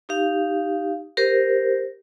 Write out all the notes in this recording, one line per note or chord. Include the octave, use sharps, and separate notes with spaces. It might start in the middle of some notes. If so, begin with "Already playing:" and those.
D#4 G4 F5
G4 A#4 C5